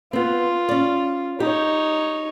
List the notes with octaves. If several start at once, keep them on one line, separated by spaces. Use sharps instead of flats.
B3 C4 F4
C#4 D5
D#4 G4 C#5